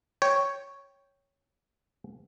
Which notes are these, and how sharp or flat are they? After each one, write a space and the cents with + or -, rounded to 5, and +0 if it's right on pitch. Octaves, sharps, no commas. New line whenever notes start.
C#5 +0 G5 +0